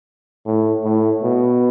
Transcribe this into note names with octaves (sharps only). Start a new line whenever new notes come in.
A2
A2
B2